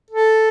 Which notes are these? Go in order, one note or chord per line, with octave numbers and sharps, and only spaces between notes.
A4